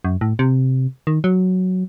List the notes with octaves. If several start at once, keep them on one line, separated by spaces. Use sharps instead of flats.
F#2
A2
C3
D#3
F#3